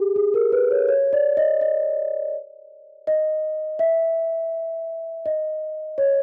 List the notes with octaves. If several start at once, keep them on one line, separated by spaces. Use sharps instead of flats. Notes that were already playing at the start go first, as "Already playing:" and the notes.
Already playing: G4 G#4
G#4
A#4
B4
C#5
C#5
D5
D#5
D#5
D#5
E5
D#5
C#5